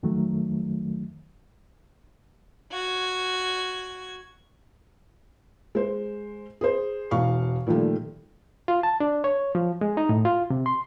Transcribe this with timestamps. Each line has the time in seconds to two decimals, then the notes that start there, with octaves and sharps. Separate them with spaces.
0.03 F2 D#3 F#3 A3
2.72 F#4 G#6
5.75 G#3 C5
6.61 G#4 C5
7.11 E1 E3 F5 C#6
7.67 A#2 D#3 F3 G3 A3
8.68 F4
8.83 A5
9.00 D4
9.24 C#5
9.55 F3
9.81 G#3
9.97 D#4
10.09 A2
10.25 F4
10.50 C3
10.66 C6